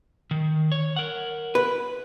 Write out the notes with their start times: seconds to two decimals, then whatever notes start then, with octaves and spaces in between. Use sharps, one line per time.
0.31 D#3
0.72 C#5
0.96 A#4 F#5
1.55 B4